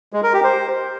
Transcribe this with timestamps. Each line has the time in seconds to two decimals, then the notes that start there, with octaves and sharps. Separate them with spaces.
0.13 G#3
0.23 A#4
0.33 G4
0.44 C5